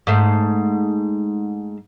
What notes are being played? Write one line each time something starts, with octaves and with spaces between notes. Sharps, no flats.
G#2 A3